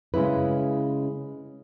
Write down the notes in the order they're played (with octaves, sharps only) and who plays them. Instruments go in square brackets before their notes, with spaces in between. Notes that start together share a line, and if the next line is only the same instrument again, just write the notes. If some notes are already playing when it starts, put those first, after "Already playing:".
[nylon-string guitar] C#3 G#3 C#4 E4 B4